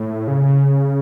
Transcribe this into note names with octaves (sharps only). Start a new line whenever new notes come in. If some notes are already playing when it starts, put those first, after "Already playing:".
Already playing: A2
C#3